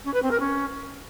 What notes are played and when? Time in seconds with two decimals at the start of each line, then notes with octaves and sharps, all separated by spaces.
0.05 C#4
0.14 B4
0.22 C4
0.31 A#4
0.40 C#4